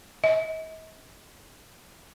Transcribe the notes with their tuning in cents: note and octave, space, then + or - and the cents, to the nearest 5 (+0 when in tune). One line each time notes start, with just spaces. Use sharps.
D#5 +45